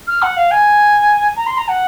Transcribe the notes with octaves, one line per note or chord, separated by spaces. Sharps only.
F6
F#5
F5
G#5
A#5
C6
A#5
F#5